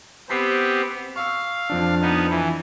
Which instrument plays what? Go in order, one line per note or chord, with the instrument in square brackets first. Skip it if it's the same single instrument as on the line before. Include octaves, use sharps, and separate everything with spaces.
[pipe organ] B3 C4 G4 [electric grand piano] B5 B6 C7
[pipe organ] F5 [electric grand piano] C#6 E6
[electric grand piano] F2 F3 D4
[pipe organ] B3 D#4
E3